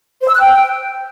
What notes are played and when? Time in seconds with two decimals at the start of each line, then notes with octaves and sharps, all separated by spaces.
0.22 C5
0.28 E6
0.34 F#6
0.40 G5